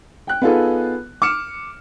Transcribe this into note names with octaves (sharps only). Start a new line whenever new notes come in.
G5 F#6
B3 D#4 F4 G#4 A4 B4
D6 F6 C#7 E7